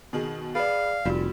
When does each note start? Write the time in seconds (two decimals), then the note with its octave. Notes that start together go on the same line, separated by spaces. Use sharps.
0.13 B2 D#3 G#4
0.55 G#4 B4 D5 F5
1.05 F1 A#2 G3 A#3 F#4